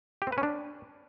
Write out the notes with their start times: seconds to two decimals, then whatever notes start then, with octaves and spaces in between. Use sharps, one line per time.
0.22 G4
0.27 C4
0.32 B4
0.38 C#4
0.43 D4